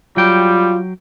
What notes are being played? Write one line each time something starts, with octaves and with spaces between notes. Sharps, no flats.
F#3 G3 F4 G5